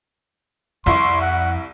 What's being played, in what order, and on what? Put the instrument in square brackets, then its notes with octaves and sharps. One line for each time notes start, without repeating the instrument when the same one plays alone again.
[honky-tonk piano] C2 E4 C#6 [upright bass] F2 [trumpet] C6
[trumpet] F#5